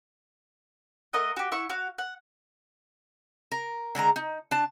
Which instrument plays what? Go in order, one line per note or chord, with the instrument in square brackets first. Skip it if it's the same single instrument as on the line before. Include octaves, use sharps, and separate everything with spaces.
[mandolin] A3 A#4 D#5 F#5
F#4 G4
E4 E5 F#5 C#6
F#4 F5
F#5
[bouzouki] A#4
D3 G#3 A#4 A#5
D#4
D4 A5